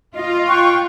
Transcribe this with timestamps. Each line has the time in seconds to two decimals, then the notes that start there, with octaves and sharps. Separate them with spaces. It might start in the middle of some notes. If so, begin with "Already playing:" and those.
0.15 F4 D#5
0.47 G5 C#6 F#6